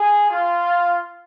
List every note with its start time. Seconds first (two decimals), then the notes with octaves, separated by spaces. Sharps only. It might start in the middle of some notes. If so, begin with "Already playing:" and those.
Already playing: G#4
0.30 F4